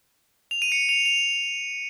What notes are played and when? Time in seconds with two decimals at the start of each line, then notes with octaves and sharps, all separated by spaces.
0.51 F7
0.62 D#7
0.72 C#7
0.89 F7
1.05 F7